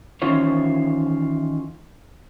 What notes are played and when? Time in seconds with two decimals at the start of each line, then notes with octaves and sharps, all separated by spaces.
0.22 D#3 E3 C#4 F4 C5 C#5